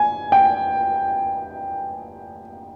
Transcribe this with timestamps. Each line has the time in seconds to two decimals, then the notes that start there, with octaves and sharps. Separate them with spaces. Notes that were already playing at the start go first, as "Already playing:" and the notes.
Already playing: G#5
0.32 G5